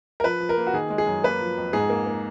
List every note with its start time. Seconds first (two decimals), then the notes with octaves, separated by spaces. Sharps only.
0.20 A#4
0.24 F3 B4
0.40 F3
0.49 A#4
0.57 A#3
0.67 F#4
0.74 D#3 G#4
0.90 G#3
0.98 G#4
1.07 F#2
1.24 A#3 B4
1.41 F3
1.58 F2
1.73 G#2 G#4
1.90 A#3
2.06 A#3